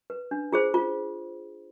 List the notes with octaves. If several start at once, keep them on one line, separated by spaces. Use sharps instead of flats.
B4
D4
F4 G#4 C5
F4